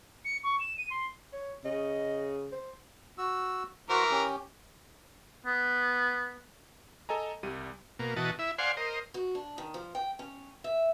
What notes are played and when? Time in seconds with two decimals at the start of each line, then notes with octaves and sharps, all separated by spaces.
0.25 C#7
0.44 C#6
0.60 E7
0.78 D#7
0.90 C6
1.33 C#5
1.65 C#3 D#5
2.52 C5
3.18 F#4 E6
3.89 E3 F#4 A#4 C5
4.11 C#4 G4
5.46 B3
7.09 A4 D#5 G#5 A#5
7.43 C2 G3 D#7
7.99 B2 A#3
8.16 B2 E3 F#4 D#5 A5
8.39 E4 E5
8.58 C5 D5 F5 F#5 G#5 C6
8.77 A#4 C5 D#5
9.14 F#4
9.35 D4
9.58 D#3
9.74 F3
9.95 G5
10.19 C#4
10.64 E5